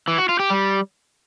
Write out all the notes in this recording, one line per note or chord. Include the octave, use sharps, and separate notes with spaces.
E3
F#4
F4
G4
G3